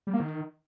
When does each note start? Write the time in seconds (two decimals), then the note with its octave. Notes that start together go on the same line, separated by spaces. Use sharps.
0.07 G3
0.13 A#3
0.20 D#3